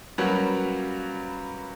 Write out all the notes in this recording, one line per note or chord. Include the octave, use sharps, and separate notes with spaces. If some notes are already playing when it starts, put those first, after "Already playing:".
F#3 G3 A#3 C#4 F#4 B4